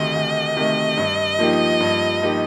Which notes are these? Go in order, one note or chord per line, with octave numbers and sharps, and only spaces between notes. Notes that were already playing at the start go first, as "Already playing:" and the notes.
Already playing: D2 C3 D#3 A3 D#5
D2
C3 D#3 A3
G2
F3 A#3 D#4 G4
G2
F3 A#3 D#4 G4